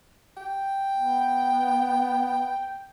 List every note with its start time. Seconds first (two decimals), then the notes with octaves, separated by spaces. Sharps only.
0.37 G5
0.97 B3